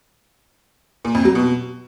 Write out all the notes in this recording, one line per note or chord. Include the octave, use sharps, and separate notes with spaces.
A#2
F2
F#3
B2